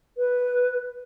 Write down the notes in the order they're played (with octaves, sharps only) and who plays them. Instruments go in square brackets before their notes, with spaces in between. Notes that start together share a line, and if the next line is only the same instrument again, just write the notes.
[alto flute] B4